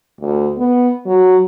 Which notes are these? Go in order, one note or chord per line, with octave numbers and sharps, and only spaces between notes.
D2
B3
F#3